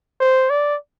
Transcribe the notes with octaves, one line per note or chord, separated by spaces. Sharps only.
C5
D5